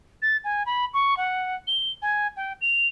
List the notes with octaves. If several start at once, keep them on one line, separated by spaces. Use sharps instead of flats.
A6
G#5
B5
C#6
F#5
G7
G#5
G5
F7